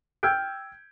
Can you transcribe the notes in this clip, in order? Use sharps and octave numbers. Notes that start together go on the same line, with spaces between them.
G5 E6 F6 G6 G#6 D7